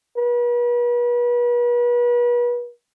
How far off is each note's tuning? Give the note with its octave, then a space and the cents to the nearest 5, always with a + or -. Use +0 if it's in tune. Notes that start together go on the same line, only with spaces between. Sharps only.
B4 -40